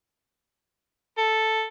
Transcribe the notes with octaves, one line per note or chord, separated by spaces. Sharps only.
A4